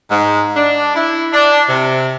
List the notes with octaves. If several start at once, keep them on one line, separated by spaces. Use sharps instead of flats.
G#2
D4
E4
D4
C3